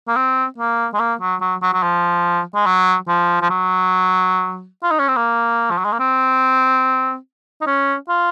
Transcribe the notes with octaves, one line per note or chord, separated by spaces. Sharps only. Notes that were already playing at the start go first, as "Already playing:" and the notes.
A#3
C4
A#3
G#3
A#3
F#3
F#3
F#3
F#3
F3
G#3
F#3
F3
F3
F#3
F4
D#4
C#4
C4
A#3
F3
F#3
G#3
A#3
C4
D#4
C#4
F4